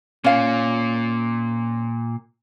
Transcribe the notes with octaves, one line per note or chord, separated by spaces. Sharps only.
A#2 C#4 F5